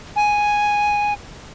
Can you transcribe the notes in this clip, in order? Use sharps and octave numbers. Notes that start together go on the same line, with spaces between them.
G#5